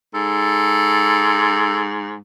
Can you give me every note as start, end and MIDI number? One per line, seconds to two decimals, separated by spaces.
0.14 2.16 44
0.14 1.84 69